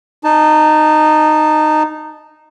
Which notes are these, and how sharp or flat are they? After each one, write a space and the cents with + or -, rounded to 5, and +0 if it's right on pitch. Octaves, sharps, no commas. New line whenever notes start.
D#4 -15 A5 +0